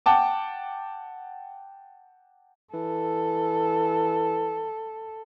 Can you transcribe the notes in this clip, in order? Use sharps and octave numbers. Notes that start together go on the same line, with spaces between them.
F#5 G5 A5 D6
E3 A4